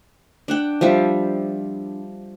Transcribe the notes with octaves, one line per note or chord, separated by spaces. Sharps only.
D4 F#5 G5
F3 G3 E5